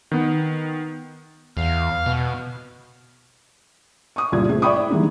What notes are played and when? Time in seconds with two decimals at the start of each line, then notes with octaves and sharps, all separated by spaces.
0.12 D#3 B3
1.57 E2 F5
2.06 B2
4.16 C#6 D#6
4.32 C#2 G2 A#2 E4 G#6
4.49 A3 C4 G#4
4.62 D5 E5 G5 B5 C#6 D#6
4.76 E4 D5
4.90 D3 E3 G3 G#3 A#3 D#4